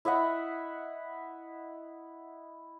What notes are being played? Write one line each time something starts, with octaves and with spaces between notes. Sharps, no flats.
E4 D#5 E5 F#5